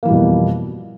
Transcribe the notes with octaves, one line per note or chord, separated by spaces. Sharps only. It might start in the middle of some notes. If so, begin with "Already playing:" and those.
F2 B2 E3 G3 A#3